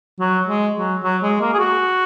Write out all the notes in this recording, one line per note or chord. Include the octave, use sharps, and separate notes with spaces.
F#3
G#3
F#3
F#3
G#3
A#3
G#4
F#4